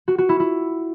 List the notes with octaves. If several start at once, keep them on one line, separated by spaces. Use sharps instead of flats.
F#4
F#4
E4
E4